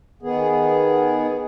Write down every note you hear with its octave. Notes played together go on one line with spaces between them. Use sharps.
D#3 B3 G#4